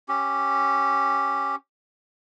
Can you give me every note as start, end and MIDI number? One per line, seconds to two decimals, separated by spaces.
0.09 1.55 61
0.09 1.55 67